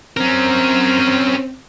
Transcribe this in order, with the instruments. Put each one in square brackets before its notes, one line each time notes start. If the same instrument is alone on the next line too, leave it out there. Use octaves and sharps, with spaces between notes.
[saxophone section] C4 [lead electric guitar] C#4 A#4